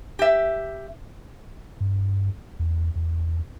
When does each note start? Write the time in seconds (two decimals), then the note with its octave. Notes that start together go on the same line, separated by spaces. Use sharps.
0.19 G4 E5
1.81 G2
2.59 E2
2.96 E2